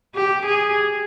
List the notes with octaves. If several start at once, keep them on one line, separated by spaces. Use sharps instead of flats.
G4
G#4